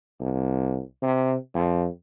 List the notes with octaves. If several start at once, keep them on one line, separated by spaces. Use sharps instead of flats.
C2
C3
F2